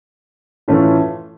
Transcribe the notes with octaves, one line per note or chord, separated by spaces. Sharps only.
A2 E3 A3 C#4 F4